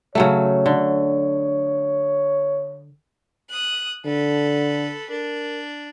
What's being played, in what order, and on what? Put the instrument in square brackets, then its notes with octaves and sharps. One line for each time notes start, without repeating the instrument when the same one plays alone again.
[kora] C#3 F#3 A3 [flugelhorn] C#5
[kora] D3
[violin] D#6 F#6
[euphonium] D3 [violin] A4 B4
[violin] D4 [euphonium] A#4